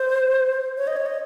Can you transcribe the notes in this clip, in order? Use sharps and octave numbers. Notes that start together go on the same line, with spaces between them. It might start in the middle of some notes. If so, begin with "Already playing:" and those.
Already playing: C5
C#5
D#5
C#5
D#5